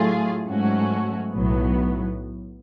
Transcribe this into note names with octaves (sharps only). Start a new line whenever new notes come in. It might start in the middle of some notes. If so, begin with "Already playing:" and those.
Already playing: A2 F#3 A3 F4 G#4
G#2 F#3 A3 C#4 F#4
B1 A2 F#3 B3